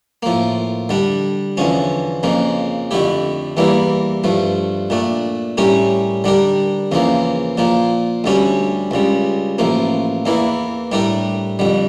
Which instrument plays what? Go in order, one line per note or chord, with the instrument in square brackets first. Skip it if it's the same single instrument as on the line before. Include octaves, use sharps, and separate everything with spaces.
[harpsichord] A2 F3 A#3
D3 G3 D4
E2 D3 F3 C#4
F2 C#3 F3 A#3
F2 D3 A3 E4 G4
E2 E3 G3 A#3 E4
G2 F3 A3
A#2 A3 D4
A2 G3 C#4 G4 A#4
D3 G3 D4 G4 A#4
E2 C#3 F3 A#3
A#2 F3 A#3
D2 D3 G3 C#4 G4
C#2 C#3 G3
A1 A2 F3 A#3
E2 E3 A#3 E4
A2 G3 D4 G4 A#4
F2 D3 G3